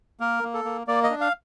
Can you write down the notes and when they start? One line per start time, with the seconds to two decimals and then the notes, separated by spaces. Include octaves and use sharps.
0.20 A#3 A#4
0.43 A#3
0.54 A4
0.65 A#3
0.87 A#3 D5
1.03 D#5
1.10 D4
1.21 F5